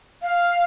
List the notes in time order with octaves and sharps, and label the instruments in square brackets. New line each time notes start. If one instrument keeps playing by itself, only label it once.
[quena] F5